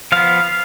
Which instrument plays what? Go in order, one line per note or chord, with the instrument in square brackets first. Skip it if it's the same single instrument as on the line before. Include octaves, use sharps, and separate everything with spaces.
[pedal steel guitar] F3 B3 F5